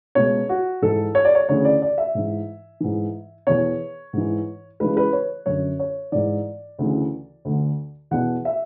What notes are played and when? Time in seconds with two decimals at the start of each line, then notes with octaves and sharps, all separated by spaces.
0.15 C#2 B2 C#5
0.49 F#4
0.82 G#2 E3 A4
1.15 C#5
1.25 D5
1.35 C#5
1.49 D2 C#3 E3 C#5
1.65 D5
1.82 D5
1.98 E5
2.15 G#2 E3
2.80 G#2 E3
3.47 E2 B2 C#5
4.13 G#2 E3
4.80 C#2 C#3 E3 B4
4.97 B4
5.13 C#5
5.46 F#2 D3 C#5
5.79 C#5
6.12 G#2 E3 D5
6.79 D2 C#3 E3
7.45 D2 D3
8.11 E2 B2 F#5
8.45 E5